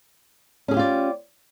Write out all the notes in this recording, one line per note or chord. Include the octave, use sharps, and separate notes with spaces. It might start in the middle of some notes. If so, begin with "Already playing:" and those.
C#4 F4 G4 G#4 D5